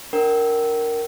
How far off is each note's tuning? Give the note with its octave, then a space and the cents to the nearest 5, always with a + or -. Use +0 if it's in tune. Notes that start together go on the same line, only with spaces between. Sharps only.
D4 +0 A#4 +0 G5 -40